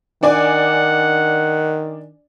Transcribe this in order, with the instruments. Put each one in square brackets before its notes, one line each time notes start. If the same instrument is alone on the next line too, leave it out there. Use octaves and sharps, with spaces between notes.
[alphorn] D#3 [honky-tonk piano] D4 D5 G#5 [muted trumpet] F#5